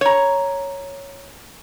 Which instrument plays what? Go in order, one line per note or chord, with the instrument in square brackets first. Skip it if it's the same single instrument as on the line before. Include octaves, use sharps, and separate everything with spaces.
[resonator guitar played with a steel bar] C#5 A#5